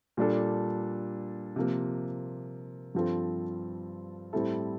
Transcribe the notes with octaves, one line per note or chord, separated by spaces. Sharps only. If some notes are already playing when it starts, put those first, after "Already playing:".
A#2 G3 D4 A4
C3 F3 A#3
G2 F3 C4 F4 A4
A2 G3 C4 E4 A4